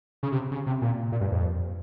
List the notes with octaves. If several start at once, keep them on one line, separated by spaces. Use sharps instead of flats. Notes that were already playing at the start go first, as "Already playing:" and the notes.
C#3
C3
C#3
C3
A#2
A#2
G2
F2